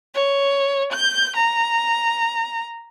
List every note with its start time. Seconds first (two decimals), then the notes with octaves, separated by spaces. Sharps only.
0.14 C#5
0.92 G6
1.36 A#5